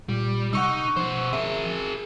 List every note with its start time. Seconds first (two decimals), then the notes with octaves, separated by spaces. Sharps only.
0.09 A#2 G3
0.53 C3 D#4 F#5 C#6 E6
0.97 B2 F3 C5
1.33 G#4 A#4 E5